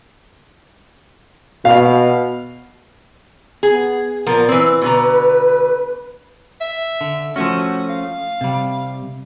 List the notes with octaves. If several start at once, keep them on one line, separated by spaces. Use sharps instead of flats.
B2 F5
B3 G#4
A#2 F3 B3 A#4
E3 C4 B4
B2 D3 A#5
E5
D3
F3 A3 C#4 F#4
F5
C3 G3